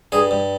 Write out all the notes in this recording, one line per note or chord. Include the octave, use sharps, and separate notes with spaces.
G2 G#4
G2